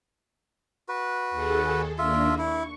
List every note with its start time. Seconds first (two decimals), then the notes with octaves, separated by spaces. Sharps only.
0.89 F#4 B4
1.31 D#2 G#4 A4
1.98 D#2 A#3 D4 F4 E5
2.38 E4 C#6